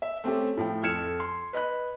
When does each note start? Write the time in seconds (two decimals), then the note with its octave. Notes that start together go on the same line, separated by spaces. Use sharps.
0.02 E5
0.24 A3 C4 C#4 G4 A4
0.57 A2 F3 G5
0.83 F2 A4 F6 G#6 C#7 E7
1.20 C6
1.53 B4 D#5 B5 F#6